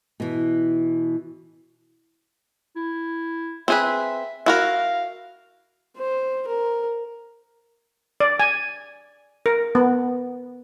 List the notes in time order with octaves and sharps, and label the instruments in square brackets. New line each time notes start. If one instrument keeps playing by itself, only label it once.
[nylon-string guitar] B2 E3
[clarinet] E4
[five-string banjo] C4 G#4 B4 [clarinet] E5
[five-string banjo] E4 F#4 A#4 [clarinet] F5
[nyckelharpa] C5
A#4
[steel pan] D5
G#5
A#4
B3